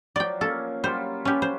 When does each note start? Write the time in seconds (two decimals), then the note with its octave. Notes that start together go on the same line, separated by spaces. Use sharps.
0.16 F3 F#3 D5 G5
0.41 A#3 C#4 A4
0.84 F#3 G3 F4 C5
1.25 C#4 G4 B4 C#5 A5
1.42 C5